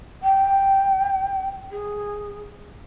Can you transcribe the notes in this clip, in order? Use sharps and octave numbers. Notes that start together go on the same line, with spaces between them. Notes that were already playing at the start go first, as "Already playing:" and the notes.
G5
G#4